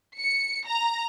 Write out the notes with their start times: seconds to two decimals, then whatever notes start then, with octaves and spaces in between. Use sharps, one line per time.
0.19 C#7
0.67 A#5